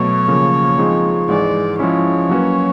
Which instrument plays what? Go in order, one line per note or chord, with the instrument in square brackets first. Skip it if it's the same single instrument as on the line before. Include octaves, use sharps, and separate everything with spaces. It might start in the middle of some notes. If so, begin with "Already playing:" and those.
Already playing: [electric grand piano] B2 F#3 A3 [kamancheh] C#5
[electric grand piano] C#3 F3 A#3
F3 G#3 C4 D#4 G#4
[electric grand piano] G#2 E3 G#3 [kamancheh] D5
[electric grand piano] F3 G#3 C#4 E4 [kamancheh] C#5
[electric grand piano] F#3 A#3 C#4 F#4 B4